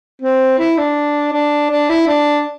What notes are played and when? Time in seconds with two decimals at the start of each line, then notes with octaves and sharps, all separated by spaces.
0.22 C4
0.59 E4
0.77 D4
1.33 D4
1.71 D4
1.89 E4
2.07 D4